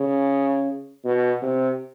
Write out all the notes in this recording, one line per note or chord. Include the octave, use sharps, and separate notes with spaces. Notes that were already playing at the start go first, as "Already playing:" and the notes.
Already playing: C#3
B2
C3